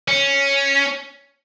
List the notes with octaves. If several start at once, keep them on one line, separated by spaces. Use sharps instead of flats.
C#4